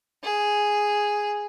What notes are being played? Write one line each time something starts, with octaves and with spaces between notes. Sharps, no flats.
G#4